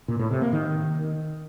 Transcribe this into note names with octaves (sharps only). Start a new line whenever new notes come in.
A#2
A2
C3
A#3
D#3